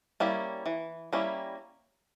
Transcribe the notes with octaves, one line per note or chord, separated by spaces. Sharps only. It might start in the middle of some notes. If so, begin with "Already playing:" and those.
G3 A#3 C#4 E4
E3
G3 A#3 C#4 E4